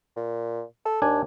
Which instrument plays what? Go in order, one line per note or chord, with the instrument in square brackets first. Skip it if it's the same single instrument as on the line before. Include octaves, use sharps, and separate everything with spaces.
[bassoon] A#2
A4
[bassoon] D#2 [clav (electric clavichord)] D4 G#5